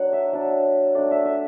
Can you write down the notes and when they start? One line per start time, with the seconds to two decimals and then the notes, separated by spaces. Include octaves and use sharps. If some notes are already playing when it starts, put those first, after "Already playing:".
Already playing: F#3 D4 F#5
0.13 E5
0.33 F#3 D4
0.95 A3 D4 D5
1.11 E5
1.25 E5